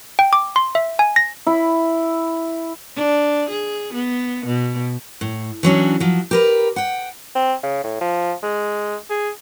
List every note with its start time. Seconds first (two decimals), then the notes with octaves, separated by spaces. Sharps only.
0.19 G5
0.33 D6
0.56 C6
0.75 E5
0.99 G#5
1.16 A#6
1.47 E4
2.96 D4
3.50 G#4
3.93 B3
4.46 B2
5.21 A2
5.63 E3 F#3 C#4 D4
6.00 F3 F#3
6.31 G4 A#4 B4
6.76 F#5 G5
7.35 C4
7.63 C#3
7.84 A2
8.01 F3
8.43 G#3
9.10 G#4